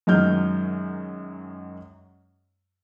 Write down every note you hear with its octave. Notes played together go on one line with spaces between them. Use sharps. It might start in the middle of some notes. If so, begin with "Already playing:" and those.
F#2 D#3 F#3 G#3 F6 G6